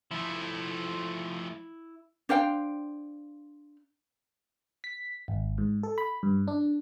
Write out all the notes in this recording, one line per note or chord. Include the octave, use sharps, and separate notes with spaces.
F3 A3 E4
D4 C5 F5 G5
B6
G#1
G#2
A4
B5
G2
D4